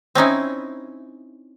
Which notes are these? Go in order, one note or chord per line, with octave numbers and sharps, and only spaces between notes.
C4 C#4 D#4 E4